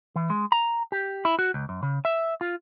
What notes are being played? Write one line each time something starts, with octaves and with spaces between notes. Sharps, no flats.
E3
G#3
A#5
G4
E4
F#4
C#2
F#2
C#3
E5
F4